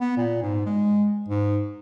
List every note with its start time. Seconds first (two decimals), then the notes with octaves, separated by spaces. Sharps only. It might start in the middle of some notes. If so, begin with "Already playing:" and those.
0.01 B3
0.17 A#2
0.42 G#2
0.66 G#3
1.28 G#2